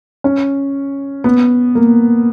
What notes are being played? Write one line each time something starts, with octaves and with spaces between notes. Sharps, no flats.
C#4
B3
A#3